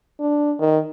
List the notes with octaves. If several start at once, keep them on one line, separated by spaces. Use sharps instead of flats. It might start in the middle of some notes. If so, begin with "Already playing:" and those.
D4
D#3